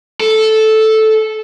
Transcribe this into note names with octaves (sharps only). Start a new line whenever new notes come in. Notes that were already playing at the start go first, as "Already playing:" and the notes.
A4